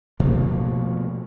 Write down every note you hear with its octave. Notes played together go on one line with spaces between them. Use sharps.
B2 F3 A3 A#3